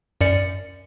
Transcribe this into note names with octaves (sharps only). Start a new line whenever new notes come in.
F#2 D5 C#7